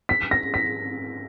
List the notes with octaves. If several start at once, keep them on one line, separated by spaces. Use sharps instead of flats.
B6
A#6
B6